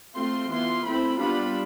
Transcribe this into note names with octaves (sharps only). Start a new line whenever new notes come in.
A3 C4 F4 C6
E3 B3 F4 C6
A3 C4 E4 B5
G3 B3 D4 F4 B5